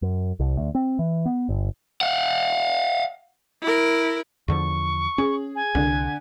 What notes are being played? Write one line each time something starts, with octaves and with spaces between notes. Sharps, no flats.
F#2
C2
D2
C4
E3
B3
G1
F5 F#5
E4 A#4
E2 D3 F3 C#6
C#4 G#4
G#5
C2 D3